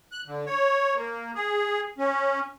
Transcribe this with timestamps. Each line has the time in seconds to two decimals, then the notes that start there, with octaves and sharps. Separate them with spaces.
0.12 F#6
0.26 D3
0.46 C#5
0.95 A#3
1.35 G#4
1.98 C#4